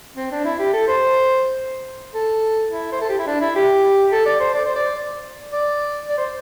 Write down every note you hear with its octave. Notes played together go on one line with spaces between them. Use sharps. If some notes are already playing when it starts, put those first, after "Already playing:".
C4
D4
E4
G4
A4
C5
A4
E4
C5
A4
G4
E4
D4
E4
G4
A4
D5
C5
D5
C5
D5
D5
D5
C5